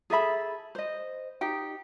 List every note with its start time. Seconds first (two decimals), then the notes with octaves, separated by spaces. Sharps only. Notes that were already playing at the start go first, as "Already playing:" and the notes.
0.10 G#4 A4 E5 B5
0.75 C5 D#5
1.41 D#4 G4 G5